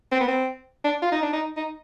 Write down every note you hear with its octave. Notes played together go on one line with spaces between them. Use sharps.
C4
B3
C4
D4
F4
D#4
D4
D#4
D#4